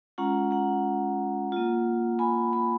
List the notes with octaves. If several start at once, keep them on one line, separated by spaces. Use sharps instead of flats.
G#3 C#4 F4 F#5 A#5
F#5 A#5
A#3 F4
G#5 B5
G#5 B5